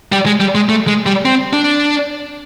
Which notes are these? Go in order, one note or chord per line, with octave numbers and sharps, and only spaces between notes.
G3
G#3
G3
G#3
A3
G#3
G3
C4
D4